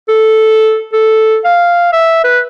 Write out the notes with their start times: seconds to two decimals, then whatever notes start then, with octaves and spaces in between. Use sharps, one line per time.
0.09 A4
0.93 A4
1.44 F5
1.93 E5
2.24 B4